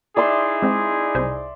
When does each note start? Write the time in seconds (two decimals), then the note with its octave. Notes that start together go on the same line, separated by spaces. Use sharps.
0.17 D#4 E4 G#4 D5 E5 C6
0.62 G#3 C4
1.15 C2 C5 G#5